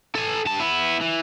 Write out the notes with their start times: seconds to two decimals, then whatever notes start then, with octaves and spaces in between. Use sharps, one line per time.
0.15 A4 G#5
0.45 G2 A5
0.59 B3 E4
1.01 E3